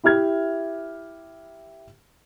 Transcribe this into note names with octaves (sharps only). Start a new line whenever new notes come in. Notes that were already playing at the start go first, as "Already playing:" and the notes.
E4 G4 E5 F6 G#6